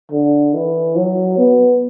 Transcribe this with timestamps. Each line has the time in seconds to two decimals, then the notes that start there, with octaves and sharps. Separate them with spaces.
0.11 D3
0.54 E3
0.96 F#3
1.38 B3